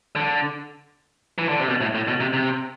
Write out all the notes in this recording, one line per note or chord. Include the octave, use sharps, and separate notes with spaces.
D3
E3
D3
C3
B2
A2
A2
B2
C3
C3